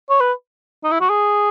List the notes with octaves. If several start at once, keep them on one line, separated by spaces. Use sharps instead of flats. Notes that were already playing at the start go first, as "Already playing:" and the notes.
C#5
B4
D#4
E4
F#4
G#4